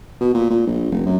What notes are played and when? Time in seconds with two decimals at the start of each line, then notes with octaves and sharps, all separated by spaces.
0.21 B2
0.34 A#2
0.50 A#2
0.67 A#1
0.91 F1
1.06 F#2